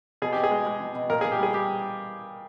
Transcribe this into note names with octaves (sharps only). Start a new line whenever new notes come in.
B2 G#4
B2 G4
G#4
G#3
G#3
B2
B2
A#2 A#4
G#4
A#2
G4
G3 G#4
G3 G4